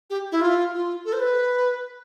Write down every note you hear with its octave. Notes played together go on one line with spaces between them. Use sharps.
G4
E4
F4
F4
A4
C5
B4